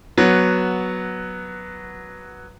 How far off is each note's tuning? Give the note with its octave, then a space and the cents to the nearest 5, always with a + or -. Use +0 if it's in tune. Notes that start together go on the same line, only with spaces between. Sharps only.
F#3 +0 B3 -10